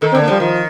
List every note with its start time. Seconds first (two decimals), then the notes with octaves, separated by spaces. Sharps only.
0.02 D#3 A4
0.12 C4
0.15 D3
0.21 A#3
0.28 F3 G3
0.40 D#3 F3